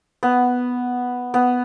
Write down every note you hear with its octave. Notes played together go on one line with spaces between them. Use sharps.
B3
B3